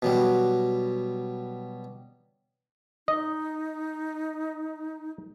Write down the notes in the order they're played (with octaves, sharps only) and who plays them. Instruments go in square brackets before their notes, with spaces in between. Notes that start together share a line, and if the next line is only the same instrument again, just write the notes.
[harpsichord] B2 F#3 G3
[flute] D#4 [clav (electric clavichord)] D#5